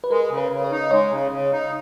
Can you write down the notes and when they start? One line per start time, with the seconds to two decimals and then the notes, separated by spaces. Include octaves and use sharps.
0.04 B4
0.10 G#3 A#4
0.31 C#3
0.38 B4
0.51 C#3
0.64 C#5
0.71 D#4
0.91 G#3 C#5
1.11 C#3
1.32 C#3
1.52 D#4